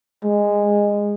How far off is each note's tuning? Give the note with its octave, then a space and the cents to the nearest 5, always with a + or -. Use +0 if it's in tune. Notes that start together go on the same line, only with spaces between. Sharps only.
G#3 -15